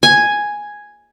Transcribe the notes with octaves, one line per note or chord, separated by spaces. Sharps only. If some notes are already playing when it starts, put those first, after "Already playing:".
G#5